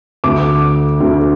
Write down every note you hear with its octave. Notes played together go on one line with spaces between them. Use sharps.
D2 D3 D6
D2 D3